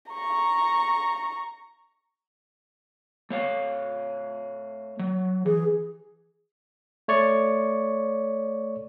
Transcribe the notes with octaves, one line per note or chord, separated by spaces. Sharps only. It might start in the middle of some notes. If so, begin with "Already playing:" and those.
A#5 C#6
A3 C#5 F5
F#3
E3 G#4
A3 C#5 D5 C#6